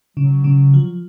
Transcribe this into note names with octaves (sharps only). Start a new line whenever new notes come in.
C#3 F#3
C#3
F3